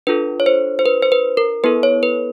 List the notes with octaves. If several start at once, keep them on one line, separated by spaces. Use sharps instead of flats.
D4 F4 A4 B4
C#5
C5
C5
B4
C5
B4
A#4
B3 E4 A4 B4
C#5
B4